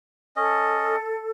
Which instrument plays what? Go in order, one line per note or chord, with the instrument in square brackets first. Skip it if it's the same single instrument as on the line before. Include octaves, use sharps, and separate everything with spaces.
[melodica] C#4 D#5 [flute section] A4